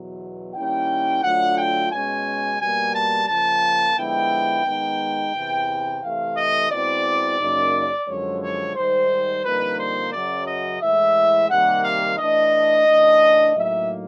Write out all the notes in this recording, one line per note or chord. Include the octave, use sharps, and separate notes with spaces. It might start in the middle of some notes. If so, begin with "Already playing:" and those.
Already playing: E2 B2 F#3
D#3 G3 A#3 C#4 E4 G5
D3 F#3 A3 D4 F4 F#5
G5
B2 G#3 C#4 G#5
B2 G3 A#3 G#5
A5
C#3 F3 A#3 A5
D3 F3 G#3 B3 E4 G5
D#3 G#3 B3 D#4
E2 C3 E3
C3 E3 A3 F5
D#5
B2 G#3 C4 E4 D5
F#2 C#3 F#3 A#3 D#4
F#2 D3 F3 G#3 C#5
C#5
G#2 D#3 G3 C5
F2 D3 G3 A#3 D#4 B4
C5
F#2 C#3 F#3 D5
D#5
A2 E3 G#3 E5
C3 D#3 G3 A#3 F#5
F5
E3 A3 D4 D#5
C#3 E3 A3 D4
A2 F#3 A#3 D#4 E5